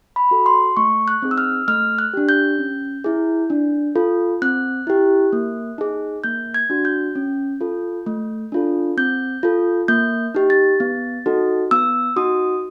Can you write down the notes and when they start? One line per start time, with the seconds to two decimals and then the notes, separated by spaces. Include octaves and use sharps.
0.16 B5
0.31 F#4 A4
0.46 C6
0.77 A3 C#6
1.08 F#6
1.22 C4 D#4 G#4
1.31 E6
1.38 F6
1.68 A3 F6
1.99 F#6
2.13 D4 G4
2.29 G6
2.59 C#4
3.04 E4 G#4
3.50 D4
3.96 F4 A4
4.42 C4 F#6
4.87 E4 G4
5.33 A#3
5.78 D#4 G#4
6.24 A#3 G6
6.54 G#6
6.70 D4 F#4
6.85 G6
7.15 C#4
7.61 F4 A4
8.06 A3
8.52 D4 F4 A4
8.97 C4 G6
9.43 F4 A4
9.88 A#3 G6
10.35 D#4 G4
10.50 A6
10.80 B3
11.26 D#4 F#4 A4
11.71 B3 E6
12.16 D#4 F#4 D#6